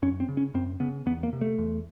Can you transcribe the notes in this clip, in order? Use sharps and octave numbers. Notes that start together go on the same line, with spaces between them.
F#2 C#4
C4
C#3
C#4
F#2 C4
C#3 B3
E2 B3
A#3
C3
A3
E2